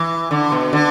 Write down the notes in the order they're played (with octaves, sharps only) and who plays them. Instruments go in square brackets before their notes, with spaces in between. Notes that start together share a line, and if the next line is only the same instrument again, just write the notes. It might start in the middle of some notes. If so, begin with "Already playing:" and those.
Already playing: [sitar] E3
D3
B2
D3